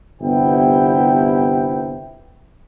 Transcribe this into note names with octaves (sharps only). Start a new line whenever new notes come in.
G1 C3 B3 E4 G5